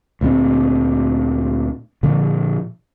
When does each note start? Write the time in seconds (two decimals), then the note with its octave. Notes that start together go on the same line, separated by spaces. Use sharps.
0.21 D2 A#2 B3 C4
2.03 A#2 D3 F3